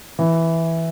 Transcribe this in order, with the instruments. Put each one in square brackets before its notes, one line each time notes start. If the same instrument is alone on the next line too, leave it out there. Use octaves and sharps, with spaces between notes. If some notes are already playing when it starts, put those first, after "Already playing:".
[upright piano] E3